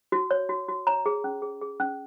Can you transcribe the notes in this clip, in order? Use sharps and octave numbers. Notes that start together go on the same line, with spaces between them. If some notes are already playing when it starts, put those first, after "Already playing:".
F#4
C#5
F#4
F#4
C#5 A#5
G#4
C#4
G#4
G#4
C#4